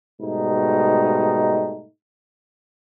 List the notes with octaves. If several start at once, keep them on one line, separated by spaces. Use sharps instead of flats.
G#2 B2 G3 A3 D#4